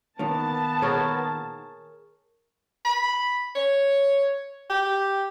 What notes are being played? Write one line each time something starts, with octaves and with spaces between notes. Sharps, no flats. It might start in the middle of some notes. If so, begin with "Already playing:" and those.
A#2 D#3 A#3 B3 A5
G#4 A#4 C#5
B5
C#5
G4